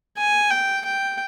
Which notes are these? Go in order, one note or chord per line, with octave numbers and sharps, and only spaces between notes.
G#5
G5
G5